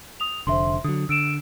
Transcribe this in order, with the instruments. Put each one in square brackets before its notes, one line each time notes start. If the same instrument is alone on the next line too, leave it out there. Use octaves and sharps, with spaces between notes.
[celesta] D#6 F7
[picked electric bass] F1 D3 [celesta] C5 E5 C6
[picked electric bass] D3 F#3 [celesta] D#6
[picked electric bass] D3 [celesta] E6 D7 E7